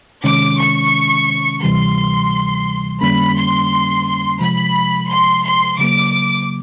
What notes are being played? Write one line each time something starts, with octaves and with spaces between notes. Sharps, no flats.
C3 D#3 G#3 C#4 D6
C#6
D2 C3 E3 G3 C6
F2 D3 G3 A#3 C#4 B5
C6
C3 F3 G#3 B5
C6
C6
C#3 F#3 A#3 D6